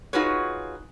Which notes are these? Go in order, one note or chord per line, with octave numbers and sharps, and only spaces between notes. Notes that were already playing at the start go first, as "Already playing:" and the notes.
D#4 F4 F#4 G#4 B4 C#5